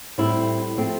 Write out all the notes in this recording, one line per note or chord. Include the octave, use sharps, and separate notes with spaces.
A2 G3 C4 E4
F3 A3 C4